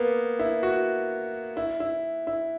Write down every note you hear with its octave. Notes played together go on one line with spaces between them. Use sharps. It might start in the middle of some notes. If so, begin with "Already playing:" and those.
Already playing: A#3 B3
E4
F#4
E4
E4
E4